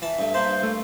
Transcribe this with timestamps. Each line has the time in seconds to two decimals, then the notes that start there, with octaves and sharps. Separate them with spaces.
0.02 E3 E5 A5
0.19 G2 A3
0.34 G2 A#3 C5 A5
0.63 A3